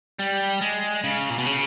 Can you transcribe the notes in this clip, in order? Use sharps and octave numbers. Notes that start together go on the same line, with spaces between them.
G3
G#3
C#3
A#2
B2
C#3